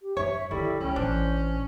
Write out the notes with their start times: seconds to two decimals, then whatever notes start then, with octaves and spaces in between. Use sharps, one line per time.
0.02 G4
0.17 F#2 C#5 E5
0.51 D3 D#3 G3 E4 A4
0.81 C#2 C#4 G5
0.96 A1 D4 C5